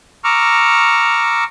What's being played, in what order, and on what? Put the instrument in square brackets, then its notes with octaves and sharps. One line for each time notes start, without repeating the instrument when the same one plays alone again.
[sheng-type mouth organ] A#5 C#6 D6 E6 F6